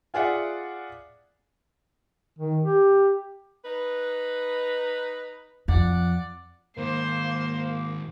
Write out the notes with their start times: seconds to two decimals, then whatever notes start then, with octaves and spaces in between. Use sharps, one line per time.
0.14 F4 G#4 D5 E5 F#5
2.39 D#3
2.64 G4
3.64 D#4 B4
5.68 F2 D5 F#5
6.77 G#2 D#3 A#3 C5